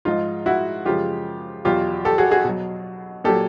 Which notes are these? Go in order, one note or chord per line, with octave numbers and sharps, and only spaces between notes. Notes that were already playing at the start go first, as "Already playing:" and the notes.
G#2 F3 G#3 D#4 F4
E4 F#4
F#2 C#3 F3 G#3 F4 G4
E2 B2 F#3 F4 G4
G4 A4
F#4 G#4
F#4 G#4
B2 F#3
A#2 F#3 G4 A4